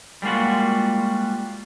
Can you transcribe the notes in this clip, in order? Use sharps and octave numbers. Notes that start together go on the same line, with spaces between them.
G3 G#3 A#3 F4 F#4